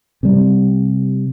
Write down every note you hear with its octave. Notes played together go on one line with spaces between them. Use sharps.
C3 G3